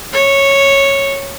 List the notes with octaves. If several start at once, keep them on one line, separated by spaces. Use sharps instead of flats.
C#5